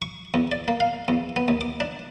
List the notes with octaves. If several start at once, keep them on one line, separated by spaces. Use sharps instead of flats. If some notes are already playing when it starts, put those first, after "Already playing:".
C#6
E2
D5
A#3
F5
E2
B3
D#2
D6
D4